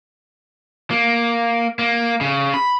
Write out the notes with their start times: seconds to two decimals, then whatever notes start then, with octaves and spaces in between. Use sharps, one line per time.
0.91 A#3
1.79 A#3
2.21 C#3
2.54 B5